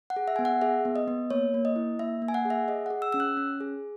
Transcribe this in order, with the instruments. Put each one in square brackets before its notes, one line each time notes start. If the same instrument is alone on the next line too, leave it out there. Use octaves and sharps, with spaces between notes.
[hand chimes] F#5
G#4
E5
B3 G#5
F#5
G#4 E5
B3
D#5
B3
A#3 C#5
A#3
D#5
E4
A#3 E5
A#3
G#5
F#5
G#4
E5
G#4 D#5
F#5
G#4
E6
C#4 E6
F#6
C#4
G#4